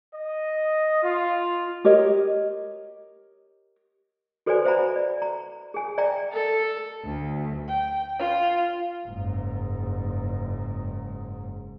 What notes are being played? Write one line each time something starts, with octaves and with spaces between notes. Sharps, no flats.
D#5
F4
G4 A#4 C#5 D#5
F#4 A4 B4 C5 D5 G#5
B4 C5 E5 F#5 A#5 B5
D5
A#5
G#4 G#5
D5 E5 G5 A#5
A4
D2
G5
F4
F#1 G#2